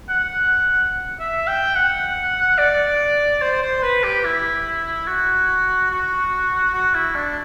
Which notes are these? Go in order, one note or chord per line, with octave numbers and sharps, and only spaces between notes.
F#5
E5
G5
F#5
D5
C5
C5
B4
G4
E4
F#4
F#4
F#4
E4
D4